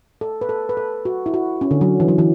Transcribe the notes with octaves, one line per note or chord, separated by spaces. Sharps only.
A4
B4
A4
B4
A4
F#4
E4
F#4
C#4
D3
F#3
E3
F#3
E3